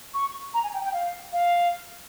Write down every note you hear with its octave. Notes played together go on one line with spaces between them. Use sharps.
C#6
A#5
G#5
G5
G5
F5
F5